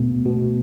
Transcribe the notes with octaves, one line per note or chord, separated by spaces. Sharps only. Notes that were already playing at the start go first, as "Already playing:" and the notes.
Already playing: B2 A3 B3
B2